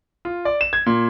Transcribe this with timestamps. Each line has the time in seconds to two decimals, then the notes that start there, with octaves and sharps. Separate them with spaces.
0.25 F4
0.45 D5
0.61 E7
0.73 G#6
0.86 A#2